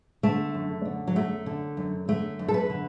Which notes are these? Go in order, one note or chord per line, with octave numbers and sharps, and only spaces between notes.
D3 A3
F#2
D3
F#3
F#2 A3
D3
F#2
D3 A3
F#2
A4
B4
D3